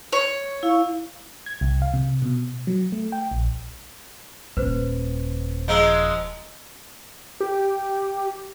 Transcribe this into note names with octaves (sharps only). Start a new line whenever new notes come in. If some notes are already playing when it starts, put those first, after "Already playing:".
C#5
E4 F5
G#6
C2
F5
C3
B2
F#3
A3
G5
A#1
D#1 B4 C5
F3 G#3 D#5 A#5 E6
G4